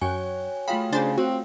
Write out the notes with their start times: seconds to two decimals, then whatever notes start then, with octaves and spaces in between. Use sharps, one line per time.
0.01 F#2 F#4 C#5 G5 G#5
0.68 A3 F4 G#4 F5 G5 B5
0.92 C#3 D4 C5 A6
1.17 C4 F#4